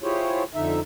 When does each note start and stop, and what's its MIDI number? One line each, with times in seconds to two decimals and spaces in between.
0.02 0.43 64
0.02 0.43 65
0.02 0.43 67
0.02 0.43 68
0.02 0.43 72
0.02 0.43 73
0.55 0.80 41
0.55 0.80 50
0.55 0.80 63
0.55 0.80 76